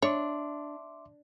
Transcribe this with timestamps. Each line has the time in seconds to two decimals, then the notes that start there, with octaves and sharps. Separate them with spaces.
0.02 D4 C#5 E5 C6 D6